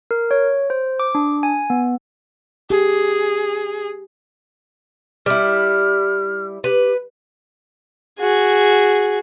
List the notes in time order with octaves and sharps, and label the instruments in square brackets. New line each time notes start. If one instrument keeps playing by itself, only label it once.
[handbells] A#4
C#5
C5
D6
D4
G#5
B3
[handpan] G4 [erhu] G#4
[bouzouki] G3 E4 [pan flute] F6
[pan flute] G4 [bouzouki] B4
[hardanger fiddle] F#4 G#4